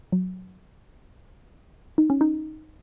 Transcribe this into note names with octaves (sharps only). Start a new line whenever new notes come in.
F#3
D#4
C#4
D#4